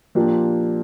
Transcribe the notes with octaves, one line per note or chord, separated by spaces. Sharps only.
A#2 F3 A#3 D4 G4